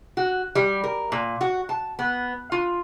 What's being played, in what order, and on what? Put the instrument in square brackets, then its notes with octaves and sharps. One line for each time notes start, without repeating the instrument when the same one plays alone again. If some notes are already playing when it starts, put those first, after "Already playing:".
[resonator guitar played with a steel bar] F#4
G3
A#4
A#2
F#4
A5
B3
F4